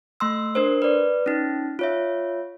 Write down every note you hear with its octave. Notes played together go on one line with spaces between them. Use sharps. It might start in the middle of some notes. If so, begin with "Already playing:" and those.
A3 C6 E6
D4 A#4 C5
B4 D5
C#4 D#4
F4 C#5 E5